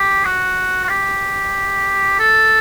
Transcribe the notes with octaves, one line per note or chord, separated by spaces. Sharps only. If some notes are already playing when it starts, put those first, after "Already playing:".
Already playing: G4
F#4
F#4
G4
A4